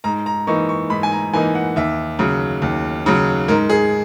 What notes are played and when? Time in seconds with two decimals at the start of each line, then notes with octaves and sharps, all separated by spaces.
0.04 G#2 A#5
0.26 A#5
0.47 E3 A#3 D#4 C#6
0.69 C#6
0.90 G#2 B5
1.03 G#5
1.12 A#5
1.33 E3 A#3 D#4 G#5
1.55 F#5
1.76 D#2 E5
2.19 C#3 F#3
2.62 D#2
3.06 C#3 F#3
3.48 G#2 A#4
3.70 G#4